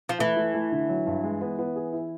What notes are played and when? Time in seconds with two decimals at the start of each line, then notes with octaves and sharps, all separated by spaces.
0.09 F3
0.19 E3 A3
0.37 A3
0.54 A3
0.72 D3
0.89 F#3
1.07 G2
1.23 G#3
1.41 B3
1.59 B3
1.76 G#4
1.93 E4